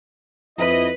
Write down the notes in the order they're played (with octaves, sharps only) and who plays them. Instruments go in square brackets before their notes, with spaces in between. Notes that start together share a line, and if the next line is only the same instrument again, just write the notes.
[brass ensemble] F2 E4 D#5 [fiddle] B4